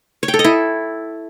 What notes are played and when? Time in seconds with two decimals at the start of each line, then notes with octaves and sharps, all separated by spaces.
0.23 C#5
0.28 G5
0.34 A4
0.39 D#5
0.44 E4